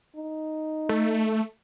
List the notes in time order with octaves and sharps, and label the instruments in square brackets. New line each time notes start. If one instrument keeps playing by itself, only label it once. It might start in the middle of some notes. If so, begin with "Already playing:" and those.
[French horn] D#4
[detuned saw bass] A3